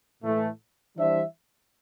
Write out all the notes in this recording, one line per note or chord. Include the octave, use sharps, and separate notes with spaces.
A2 E3 A3
E3 G3 D4 C5 E5